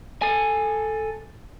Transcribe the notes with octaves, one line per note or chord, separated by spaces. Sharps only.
A4 G#5